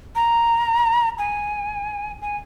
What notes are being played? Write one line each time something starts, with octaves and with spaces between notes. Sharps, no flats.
A#5
G#5
G#5